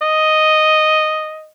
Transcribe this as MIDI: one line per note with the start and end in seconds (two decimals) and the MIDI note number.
0.02 1.49 75